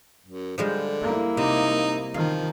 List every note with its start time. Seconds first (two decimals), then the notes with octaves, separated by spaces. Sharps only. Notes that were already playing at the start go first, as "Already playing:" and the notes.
0.27 F#2
0.58 D3 F3 G3 G#3
1.02 A#3 E4
1.37 C3 D#4
2.14 D#3 F3 F5